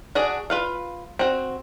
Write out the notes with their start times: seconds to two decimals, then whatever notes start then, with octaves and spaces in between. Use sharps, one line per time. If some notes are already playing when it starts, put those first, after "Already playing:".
0.15 D4 F#4 G#4 D5
0.50 F4 B4 F5
1.19 C4 F#4